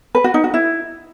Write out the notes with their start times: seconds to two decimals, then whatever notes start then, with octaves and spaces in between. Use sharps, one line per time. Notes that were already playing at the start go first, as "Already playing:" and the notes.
0.15 B4
0.24 F#4
0.34 D#4
0.44 F#4
0.54 E4